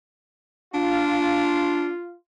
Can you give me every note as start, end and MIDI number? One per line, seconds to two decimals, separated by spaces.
0.74 1.91 62
0.74 2.16 65